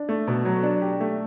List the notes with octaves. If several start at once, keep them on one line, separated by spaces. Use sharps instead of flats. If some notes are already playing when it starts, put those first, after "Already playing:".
Already playing: D4
A3
B2
F#3
D4
G4
A3